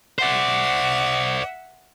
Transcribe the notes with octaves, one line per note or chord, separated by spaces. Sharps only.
C5 D5 E5 F#5